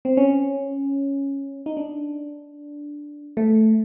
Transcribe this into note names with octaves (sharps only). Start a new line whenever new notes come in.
C4
C#4
D#4
D4
A3